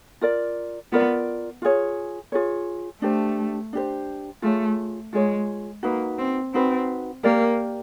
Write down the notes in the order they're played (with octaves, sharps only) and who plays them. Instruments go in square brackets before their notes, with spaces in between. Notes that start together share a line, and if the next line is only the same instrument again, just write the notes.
[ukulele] F4 A#4 D5
[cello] B3 [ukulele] F4 A#4 D5
[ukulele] F4 G#4 C#5
F4 G#4 C#5
[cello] A3 [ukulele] D4 G4 C5
[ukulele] D4 G4 C5
[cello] A3 [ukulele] F4 G#4 C#5
[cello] G#3 [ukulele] F4 G#4 C#5
[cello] A#3 [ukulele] D#4 F#4 B4
[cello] C4
[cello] C4 [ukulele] D#4 F#4 B4
[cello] A#3 [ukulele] G4 A#4 D5